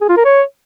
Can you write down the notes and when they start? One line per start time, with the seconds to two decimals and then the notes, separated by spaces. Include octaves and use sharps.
0.01 G#4
0.09 F4
0.17 A#4
0.25 C#5